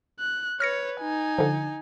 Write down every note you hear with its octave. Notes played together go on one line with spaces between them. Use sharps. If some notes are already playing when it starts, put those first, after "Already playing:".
F#6
B4 C#5 F6 A#6 C#7
D#4 G#5
D3 F3